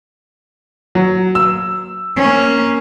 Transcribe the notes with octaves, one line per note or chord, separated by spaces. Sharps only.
F#3
E6
A#3 C#4